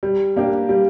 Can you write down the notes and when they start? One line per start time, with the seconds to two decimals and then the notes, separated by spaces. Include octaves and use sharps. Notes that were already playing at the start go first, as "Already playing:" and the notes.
0.03 G3
0.36 A#3 D4 G4
0.69 G3